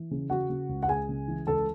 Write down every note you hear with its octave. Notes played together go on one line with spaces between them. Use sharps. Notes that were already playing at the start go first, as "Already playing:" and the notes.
Already playing: E3
C#3
C#3 F#4 F#5
C#3
C#2
F#5
C#2 G#4 G#5
C#3
E3
C#2 A4 A5